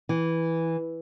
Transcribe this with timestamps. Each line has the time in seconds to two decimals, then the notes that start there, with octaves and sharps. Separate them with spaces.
0.09 E3